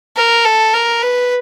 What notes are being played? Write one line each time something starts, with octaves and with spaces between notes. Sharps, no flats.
A#4
A4
A#4
B4